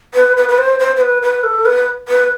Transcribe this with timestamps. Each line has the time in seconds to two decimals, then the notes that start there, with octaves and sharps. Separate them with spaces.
0.14 B4
0.37 B4
0.48 B4
0.58 C5
0.79 C5
0.96 C5
1.01 B4
1.22 B4
1.43 A4
1.65 B4
2.08 B4